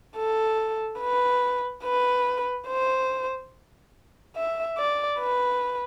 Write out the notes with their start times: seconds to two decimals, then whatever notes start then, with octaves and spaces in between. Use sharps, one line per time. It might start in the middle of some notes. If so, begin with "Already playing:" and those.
0.16 A4
1.00 B4
1.84 B4
2.68 C5
4.36 E5
4.78 D5
5.20 B4